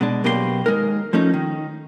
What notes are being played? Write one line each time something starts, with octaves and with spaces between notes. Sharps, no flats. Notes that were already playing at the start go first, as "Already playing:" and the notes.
B2 G#3 D4
F#2 B2 A#3 G4 A#4 C6
D#2 G#3 D#4 A#4
F3 A3 C#4 D#4
D#3